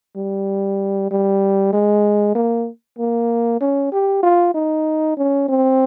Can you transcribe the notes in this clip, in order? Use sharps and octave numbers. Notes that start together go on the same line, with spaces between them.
G3
G3
G#3
A#3
A#3
C#4
G4
F4
D#4
C#4
C4